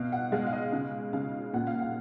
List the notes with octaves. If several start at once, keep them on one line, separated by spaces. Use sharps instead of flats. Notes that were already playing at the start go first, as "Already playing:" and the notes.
Already playing: B2 F5
F#5
G#3 F5
F5
D#5
C#3 F5
C#3 F5
A#2 F#5
F5
F#5